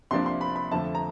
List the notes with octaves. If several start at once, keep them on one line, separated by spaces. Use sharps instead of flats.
C2 C3 F3 A#3 D4 C6
C6
B5
B5
F2 D3 F3 A3 A5
A#5